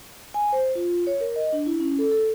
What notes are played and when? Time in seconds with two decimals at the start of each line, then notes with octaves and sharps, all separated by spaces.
0.34 G#5
0.53 C5
0.75 F4
1.07 C#5
1.21 A#4
1.36 D#5
1.52 D4
1.66 E4
1.80 C#4
1.99 A4
2.12 A4